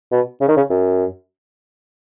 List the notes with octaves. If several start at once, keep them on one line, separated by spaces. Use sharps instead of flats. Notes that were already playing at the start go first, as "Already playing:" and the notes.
B2
C#3
D#3
C#3
F#2